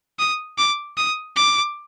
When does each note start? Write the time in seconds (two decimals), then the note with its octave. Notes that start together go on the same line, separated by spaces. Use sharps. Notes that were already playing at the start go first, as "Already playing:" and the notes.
0.19 D#6
0.58 D6
0.97 D#6
1.36 D6